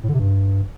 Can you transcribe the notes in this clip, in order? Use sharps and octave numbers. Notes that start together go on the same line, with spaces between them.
A2
D3
C3
G2